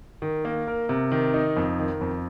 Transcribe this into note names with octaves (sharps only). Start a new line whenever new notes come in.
D#3
A#3
A#4
C3
D#3
D#4
F2
D#3
F2